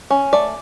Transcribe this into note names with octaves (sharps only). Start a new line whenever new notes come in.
C#4
A3 D5